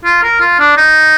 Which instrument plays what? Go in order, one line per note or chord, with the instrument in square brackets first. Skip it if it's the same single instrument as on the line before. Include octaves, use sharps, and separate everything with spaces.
[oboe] F4
A#4
F4
D4
D#4